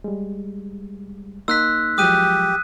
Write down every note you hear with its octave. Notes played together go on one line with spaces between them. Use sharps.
G3 G#3
A#3 D#4 C6 E6 F#6 B6
F3 F#3 G#3 G4 D#6 F#6 D#7